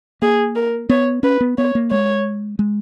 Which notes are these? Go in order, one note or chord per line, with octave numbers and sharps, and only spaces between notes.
A#3 G#4
A#4
B3 C#5
C#4 B4
B3
B3 C#5
A#3
G#3 C#5
G#3